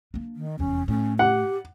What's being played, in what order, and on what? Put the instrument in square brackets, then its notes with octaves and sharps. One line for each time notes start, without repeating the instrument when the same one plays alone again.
[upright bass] A#3 D4
[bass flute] D#3
[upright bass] F1 E2 [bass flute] C#4
[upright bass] A2 [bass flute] C#4
[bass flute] G4 [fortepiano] F#5